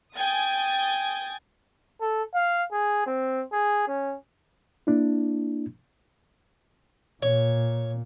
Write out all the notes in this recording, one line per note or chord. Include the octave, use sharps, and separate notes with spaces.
G5 G#5 D#6 G#6 A6
A4
F5
G#4
C4
G#4
C#4
A#3 D4 E4
A#2 C#5